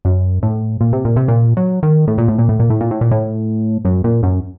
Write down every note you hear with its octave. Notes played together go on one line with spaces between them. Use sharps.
F#2
A2
A#2
C3
A#2
C3
A#2
F#3
D#3
A2
A#2
A2
A#2
A2
A#2
A2
A#2
A2
A#2
A2
F#2
A#2
F#2